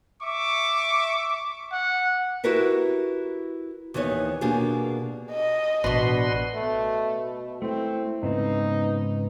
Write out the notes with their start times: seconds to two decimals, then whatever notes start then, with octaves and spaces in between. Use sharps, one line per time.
0.23 E5 C#6 D6
1.72 F#5
2.44 E4 F#4 G4 A#4 B4 E5
3.94 D#2 E3 B3 D#4 C#5
4.41 B2 A#3 D4 F4 G4 G#4
5.32 D#5
5.84 A1 B2 D4 F#4 B4 C6
6.54 B2 A3
7.62 A3 C4 E4
8.23 G#2 C#3 B3 C4 D#4